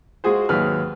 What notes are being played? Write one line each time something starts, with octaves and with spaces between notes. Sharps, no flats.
G#3 F4 F#4 G#4 C5
D#2 G#2 F#3 B4 F6